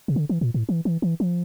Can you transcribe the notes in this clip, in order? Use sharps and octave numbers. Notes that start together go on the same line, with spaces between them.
C3
D3
E3
A#2
A2
E3
E3
E3
F3